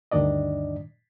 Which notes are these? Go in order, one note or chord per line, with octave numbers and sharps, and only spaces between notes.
D2 G2 D#3 D4 D5 D#5